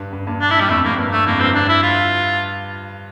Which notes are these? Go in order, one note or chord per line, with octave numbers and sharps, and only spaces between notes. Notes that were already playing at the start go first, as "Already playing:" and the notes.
Already playing: G2
G2
G2 A#2
D4
E4
G3
F2 A2 A3
F2 A2 A#3
G2
A3
F2 A2 A#3
G2 C4
G2 D4
E4
F4